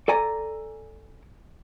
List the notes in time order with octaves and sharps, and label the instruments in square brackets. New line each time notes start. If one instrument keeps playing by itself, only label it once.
[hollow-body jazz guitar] A4 D5 G#5 A#5